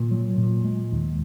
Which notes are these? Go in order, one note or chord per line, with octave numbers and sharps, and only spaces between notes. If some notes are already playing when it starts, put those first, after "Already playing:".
Already playing: A#2
F#3
A#2
G#3
D#2